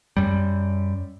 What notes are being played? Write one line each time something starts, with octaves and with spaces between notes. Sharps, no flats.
F#2 G3